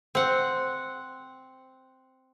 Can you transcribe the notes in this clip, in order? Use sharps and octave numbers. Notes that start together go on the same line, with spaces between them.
C4 F#5